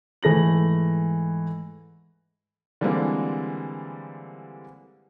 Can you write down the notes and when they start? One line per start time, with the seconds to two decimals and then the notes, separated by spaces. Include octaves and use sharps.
0.23 G#2 E3 A3 A#6 F#7
2.81 D3 E3 G3 G#3 A#3 C4